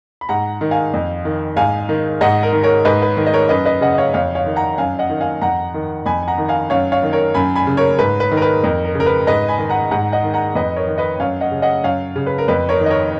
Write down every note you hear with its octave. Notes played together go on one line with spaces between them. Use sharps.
B5
G#2 F#5 A#5
D#3
F5 G#5
F2
D#3
G#2 F5 G#5
D#3
G#2 D#5 F#5
A#4
D#3
A#4 C#5
G#2 B4 D#5
B4
D#3
D#5
A#4 C#5
F#2 B4 D#5
B4 D#5
C#3 D#5 F#5
D#5
C#5 F5
F2 C#5 F5
C#5 F5
D#3
F#5 A#5
F#2 F5 G#5
D#5 F#5
D#3
F5 G#5
F2 F#5 A#5
D#3
F2 G#5 B5
G#5
F#5 A#5
D#3
F5 G#5
F#2 C#5 F5
C#5 F5
D#3
A#4 C#5
F#2 G#5 B5
G#5 B5
C#3
A#4 C#5
G#2 B4
B4
D#3
A#4
B4
F2 A#4
A#4
C#3
A#4
B4
G#2 B4 D#5
G#5 B5
D#3
F#5 A#5
G#2 F#5 A#5
D#5 F#5
D#3
F#5 A#5
F2 B4 D#5
A#4 C#5
D#3
B4 D#5
F#2 C#5 F5
D#5 F#5
C#3
D#5 F#5
F#2 C#5 F5
C#3
B4
A#4
F2 B4
A#4 C#5
D#3
D#5
A#4 C#5